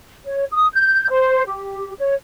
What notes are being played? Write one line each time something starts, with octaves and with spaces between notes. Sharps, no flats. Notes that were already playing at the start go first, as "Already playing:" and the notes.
C#5
D#6
G6
C5
G4
C#5